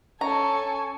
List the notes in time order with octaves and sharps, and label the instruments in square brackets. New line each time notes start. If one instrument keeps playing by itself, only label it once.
[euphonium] C#4 [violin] A4 G#5 [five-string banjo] A#5 [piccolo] C#6